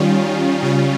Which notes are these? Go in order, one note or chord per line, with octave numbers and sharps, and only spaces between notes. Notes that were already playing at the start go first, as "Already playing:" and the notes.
Already playing: D#3 G3 C#4 F4
C#3 G3 C#4 F4